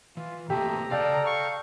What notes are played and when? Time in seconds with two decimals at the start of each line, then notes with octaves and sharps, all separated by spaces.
0.17 E3 F4
0.50 C3 A3 A#3 G4 E5 A5 A#5
0.91 C#3 A4 D5 F5 G5 F6
1.26 F5 C#6